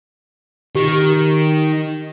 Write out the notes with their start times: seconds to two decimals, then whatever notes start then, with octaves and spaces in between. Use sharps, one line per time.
0.75 D#3 G4